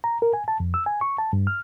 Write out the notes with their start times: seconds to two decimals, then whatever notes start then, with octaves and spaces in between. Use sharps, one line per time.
0.04 A#5
0.22 A#4
0.33 G#5
0.48 A5
0.60 F2
0.74 E6
0.86 G#5
1.01 C#6
1.18 A5
1.33 G2
1.47 F6